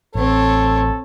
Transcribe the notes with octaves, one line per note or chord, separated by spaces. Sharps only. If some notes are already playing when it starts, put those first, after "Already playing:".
A1 C4 A4 C#5